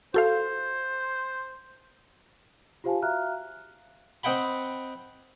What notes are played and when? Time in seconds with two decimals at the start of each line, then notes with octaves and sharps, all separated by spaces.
0.14 F#4 A4 C5 F5
2.84 F4 G4 C5 F5 G#5 A5
3.02 F#4 E5 F5 A#5 F6 F#6
4.24 C4 D#5 F#5 G5 B5